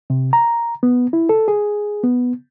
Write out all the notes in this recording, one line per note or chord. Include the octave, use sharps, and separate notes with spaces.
C3
A#5
B3
E4
A4
G#4
B3